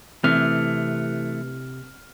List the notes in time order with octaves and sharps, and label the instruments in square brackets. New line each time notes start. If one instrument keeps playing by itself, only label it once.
[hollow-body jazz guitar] C3 [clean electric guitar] E3 A3 [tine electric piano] F6